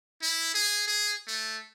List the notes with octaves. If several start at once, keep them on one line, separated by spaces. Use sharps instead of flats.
E4
G#4
G#4
A3